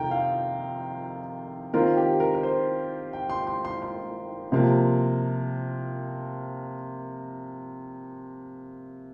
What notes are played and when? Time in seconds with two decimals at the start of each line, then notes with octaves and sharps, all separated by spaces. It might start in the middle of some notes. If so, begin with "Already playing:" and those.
Already playing: F2 C3 D#3 G5 A#5
0.11 F5
1.73 D#3 C4 F4 A#4
1.97 G4
2.20 A#4
2.34 A#4
2.43 C5
3.13 G5
3.30 C6
3.47 C6
3.65 C6
3.82 C6
4.52 C3 F3 A#3